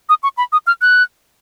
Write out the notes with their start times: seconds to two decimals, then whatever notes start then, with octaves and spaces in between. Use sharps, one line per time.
0.09 D#6
0.23 C#6
0.37 B5
0.52 D#6
0.67 F6
0.81 F#6